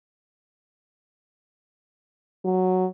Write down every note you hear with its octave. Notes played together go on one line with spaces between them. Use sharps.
F#3